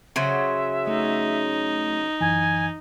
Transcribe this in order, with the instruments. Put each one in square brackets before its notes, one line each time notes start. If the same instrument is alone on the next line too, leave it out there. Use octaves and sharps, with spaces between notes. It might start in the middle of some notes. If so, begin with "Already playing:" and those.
[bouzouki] C#3 F#3 C5 [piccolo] E5
[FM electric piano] A3 [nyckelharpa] D#4
[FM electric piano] F#2 E3 [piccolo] G#5